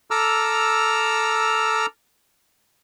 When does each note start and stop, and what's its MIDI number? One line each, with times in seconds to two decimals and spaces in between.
0.11 1.86 69
0.11 1.86 82
0.11 1.86 86
0.11 1.86 88
0.11 1.86 89